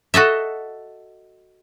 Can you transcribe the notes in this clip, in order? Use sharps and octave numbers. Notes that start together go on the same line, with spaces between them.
F#4 A4 D#5 E5